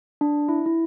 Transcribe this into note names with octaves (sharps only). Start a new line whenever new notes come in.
D4
E4
E4